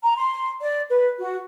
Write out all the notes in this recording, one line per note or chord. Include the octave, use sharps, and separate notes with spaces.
A#5
C6
D5
B4
F#4